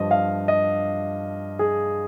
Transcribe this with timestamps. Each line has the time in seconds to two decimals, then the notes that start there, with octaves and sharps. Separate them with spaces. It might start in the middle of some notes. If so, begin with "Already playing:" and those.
Already playing: G2 F3 D#5
0.11 F5
0.48 D#5
1.59 G#4